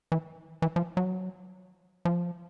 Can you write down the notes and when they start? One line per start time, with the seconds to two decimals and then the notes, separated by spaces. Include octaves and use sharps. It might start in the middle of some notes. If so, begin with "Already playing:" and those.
0.12 E3
0.62 E3
0.76 F3
0.97 F#3
2.05 F3